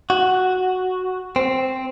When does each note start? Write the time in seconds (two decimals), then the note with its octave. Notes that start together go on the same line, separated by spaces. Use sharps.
0.10 F#4
1.36 C4